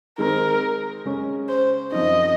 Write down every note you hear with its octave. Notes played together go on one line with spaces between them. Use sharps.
D#3 G#3 C4 A#4
C#3 G#3 C#4
C5
F#2 F3 C4 D#4 D#5